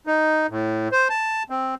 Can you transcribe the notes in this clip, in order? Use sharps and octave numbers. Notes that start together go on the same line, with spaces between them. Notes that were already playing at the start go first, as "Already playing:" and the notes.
D#4
A2
C5
A5
C4